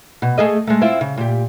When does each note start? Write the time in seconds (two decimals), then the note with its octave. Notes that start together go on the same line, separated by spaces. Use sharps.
0.22 B2
0.38 A3 G#4 D#5
0.67 G#3 A3
0.81 C4 E4 F4
1.01 C#3
1.17 A#2 G4